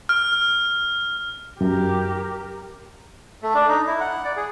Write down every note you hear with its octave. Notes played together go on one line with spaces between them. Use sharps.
F6
F#2 G4 A#4
A3
D4
D#4
E4
F#5
D5
G#4